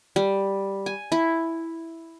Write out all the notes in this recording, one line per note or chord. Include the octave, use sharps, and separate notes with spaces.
G3
G#5
E4